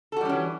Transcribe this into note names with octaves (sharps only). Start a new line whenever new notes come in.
E3 G3 C#4 F#4 A4